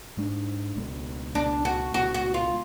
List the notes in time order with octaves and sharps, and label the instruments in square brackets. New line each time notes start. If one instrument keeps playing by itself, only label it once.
[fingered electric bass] G#2 G#3 D4
C#2 B2 G#3 B3
[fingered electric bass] C#2 B2 G#3 B3 [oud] D4
[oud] F#4
[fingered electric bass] C#2 B2 G#3 B3 [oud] F#4
[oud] F#4
F4